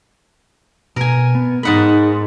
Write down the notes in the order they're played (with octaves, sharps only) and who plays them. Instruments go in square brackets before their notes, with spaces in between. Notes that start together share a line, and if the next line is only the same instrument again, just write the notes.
[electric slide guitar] B2 [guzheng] A#4 G#5
[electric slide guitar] B3
[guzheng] G#2 F#5 B5 [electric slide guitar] D#4 A#4